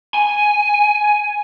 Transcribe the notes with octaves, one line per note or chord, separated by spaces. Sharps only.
G#5